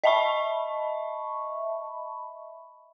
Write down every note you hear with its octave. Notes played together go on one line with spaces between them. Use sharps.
D#5 E5 A5 B5 C#6